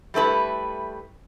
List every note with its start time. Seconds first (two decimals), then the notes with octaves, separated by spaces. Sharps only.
0.14 G3 A3 E4 B4